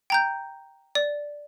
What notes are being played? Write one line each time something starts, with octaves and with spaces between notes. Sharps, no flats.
G5 A#5 G6
D5